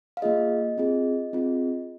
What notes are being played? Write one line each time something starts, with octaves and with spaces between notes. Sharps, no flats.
F5
A#3 F4 G#4 D#5
C4 F4 G#4
C4 F4 G#4